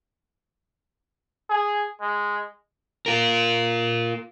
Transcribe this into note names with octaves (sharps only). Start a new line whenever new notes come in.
G#4
G#3
F4 A#4